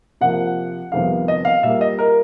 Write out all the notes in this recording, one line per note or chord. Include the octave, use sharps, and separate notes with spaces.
C3 F3 A#3 F#5
F2 C3 D#3 G3 B3 F5
D#5
F5
A#2 G3 A#3 E5
D#5
A#4